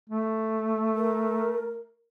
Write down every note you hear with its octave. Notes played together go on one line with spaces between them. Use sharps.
A3
A#4